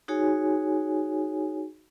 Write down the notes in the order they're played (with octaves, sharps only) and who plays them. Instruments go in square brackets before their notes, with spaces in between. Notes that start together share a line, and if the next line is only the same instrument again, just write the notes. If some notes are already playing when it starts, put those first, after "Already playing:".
[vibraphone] D#4 F#4 G#4 C#5 G#5